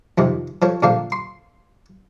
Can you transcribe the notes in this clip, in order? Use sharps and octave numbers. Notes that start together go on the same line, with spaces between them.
F2 C3 D#3
F3 A4 C#5
A#2 D3 F3 A4 F5
C6